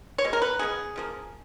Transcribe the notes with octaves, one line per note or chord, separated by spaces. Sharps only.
C#5
B2 G#3
A#4
B4
C#3 G#3 B3 G#4
C#3 F3 A#3